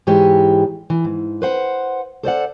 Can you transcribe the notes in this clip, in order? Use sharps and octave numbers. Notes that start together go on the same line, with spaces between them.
G#2 E3 G#3 G4 C#5
E3
G#2
B4 C5 F#5
A4 C5 D5 F#5